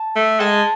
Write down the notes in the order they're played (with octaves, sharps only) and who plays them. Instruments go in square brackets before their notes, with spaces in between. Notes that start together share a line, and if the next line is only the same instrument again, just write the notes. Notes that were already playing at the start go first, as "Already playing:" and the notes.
Already playing: [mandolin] A5
[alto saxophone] A3
[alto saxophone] G#3 [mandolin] A5